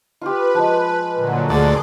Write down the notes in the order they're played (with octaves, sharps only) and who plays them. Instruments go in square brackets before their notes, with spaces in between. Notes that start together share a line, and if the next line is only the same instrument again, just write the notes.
[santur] F4 G4 [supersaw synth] B4
[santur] F3 G#3
[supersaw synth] A#2 D3 F#3
[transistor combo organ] D2 D5 [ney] G#4 [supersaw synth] C6 D6